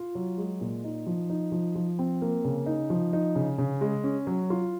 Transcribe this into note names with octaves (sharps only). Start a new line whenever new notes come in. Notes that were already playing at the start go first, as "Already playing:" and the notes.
Already playing: F4
F#3
G#3
A#2
D#4
F3
D#4
F3
F3
C4
A#3
C#3
D#4
F3
D#4
C#3
C#3
G#3
C#4
F#3
F4